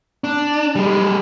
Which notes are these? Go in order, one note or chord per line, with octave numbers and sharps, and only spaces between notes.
D4
G3 G#3